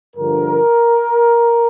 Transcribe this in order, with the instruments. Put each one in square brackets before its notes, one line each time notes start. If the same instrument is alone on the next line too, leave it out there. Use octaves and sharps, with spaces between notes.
[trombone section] G2 D3 F3 A#4